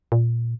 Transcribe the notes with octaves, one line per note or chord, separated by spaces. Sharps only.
A#2